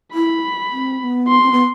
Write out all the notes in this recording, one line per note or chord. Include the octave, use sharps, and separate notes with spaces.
E4 B5
C4
C4
B3
C6
C4
B3